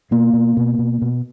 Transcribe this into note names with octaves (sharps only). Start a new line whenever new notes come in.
B2 A#3
B2
B2
B2
B2